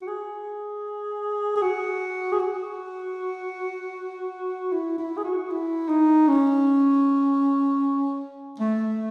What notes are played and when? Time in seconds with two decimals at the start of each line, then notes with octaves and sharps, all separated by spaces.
0.02 F#4
0.07 G#4
1.56 G#4
1.62 F#4
2.32 G#4
2.40 F#4
4.72 E4
4.99 E4
5.17 G#4
5.24 F#4
5.50 E4
5.89 D#4
6.28 C#4
8.60 A3